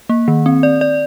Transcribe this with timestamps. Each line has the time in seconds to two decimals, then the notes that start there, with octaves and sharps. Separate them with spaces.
0.10 A#3
0.28 D#3
0.46 C4
0.63 D5
0.81 D5